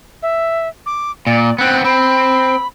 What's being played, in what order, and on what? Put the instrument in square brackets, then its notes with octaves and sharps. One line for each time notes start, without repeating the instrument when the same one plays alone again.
[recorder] E5
D6
[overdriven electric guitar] A#2 [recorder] D5
[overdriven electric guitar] B3 C4 [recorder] F#6
[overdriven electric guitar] C4 [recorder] B5